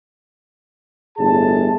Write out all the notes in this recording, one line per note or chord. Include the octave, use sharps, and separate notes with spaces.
G1 A2 A3 G#4 A5